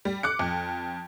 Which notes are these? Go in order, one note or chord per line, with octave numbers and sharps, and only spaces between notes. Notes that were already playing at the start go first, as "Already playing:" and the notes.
G3
D6 F#6 C#7
F2